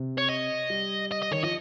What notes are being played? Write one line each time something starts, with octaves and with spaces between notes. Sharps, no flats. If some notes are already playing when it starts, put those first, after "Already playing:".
Already playing: C3
C#5
D#5
G3
D#5
D#5
D#3 C#5
F3 D#5